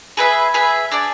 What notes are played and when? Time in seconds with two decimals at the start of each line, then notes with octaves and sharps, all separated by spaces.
0.17 G#4 B4 E5
0.54 G#4 B4 E5
0.91 D4 G#4 D5